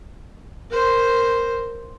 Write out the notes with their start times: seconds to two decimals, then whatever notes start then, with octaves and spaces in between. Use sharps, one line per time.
0.70 A#4 C5